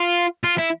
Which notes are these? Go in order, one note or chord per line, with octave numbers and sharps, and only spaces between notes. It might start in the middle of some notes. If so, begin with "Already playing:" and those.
Already playing: F4
F4
E4